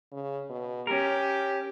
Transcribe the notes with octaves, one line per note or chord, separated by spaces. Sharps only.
C#3
B2
C#4 G4 A#4